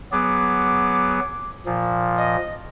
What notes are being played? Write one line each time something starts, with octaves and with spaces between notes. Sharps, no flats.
F#3 B3 G#4 D6
A#2 F3
D#5